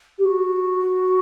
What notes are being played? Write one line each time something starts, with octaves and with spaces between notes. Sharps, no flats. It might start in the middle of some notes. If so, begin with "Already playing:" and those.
G4
F#4